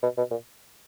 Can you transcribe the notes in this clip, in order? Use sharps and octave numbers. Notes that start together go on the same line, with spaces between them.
B2
B2
A#2